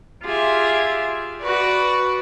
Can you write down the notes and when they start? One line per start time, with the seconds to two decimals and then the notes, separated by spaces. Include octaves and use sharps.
0.24 F4 G4 G#4 E5
1.41 F#4 B4 D5